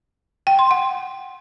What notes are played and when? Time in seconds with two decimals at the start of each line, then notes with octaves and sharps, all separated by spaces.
0.47 G5
0.59 C6
0.71 F#5